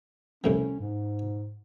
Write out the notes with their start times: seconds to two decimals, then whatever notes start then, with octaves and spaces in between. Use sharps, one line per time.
0.44 C2 A2 F3 C#4
0.80 G#2